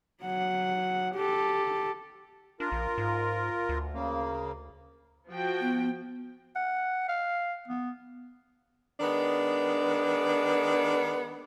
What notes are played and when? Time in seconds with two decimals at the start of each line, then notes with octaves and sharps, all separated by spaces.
0.23 F#3 F#5
1.15 G4 A4
2.60 D4 F4 A#4
2.72 A#1
2.98 G#2
3.69 D2
3.94 C#3 A#3
5.29 F3 F#4 G5
5.61 B3
6.56 F#5
7.09 F5
7.68 B3
9.00 D#3 G#3 B3 D4